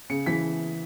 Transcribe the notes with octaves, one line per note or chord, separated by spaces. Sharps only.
C#3 C#7
E3 B6